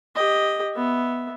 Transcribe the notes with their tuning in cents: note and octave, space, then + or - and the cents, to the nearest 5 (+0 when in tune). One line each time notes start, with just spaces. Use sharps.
G4 +15 D#5 +0
B3 +0 E5 +0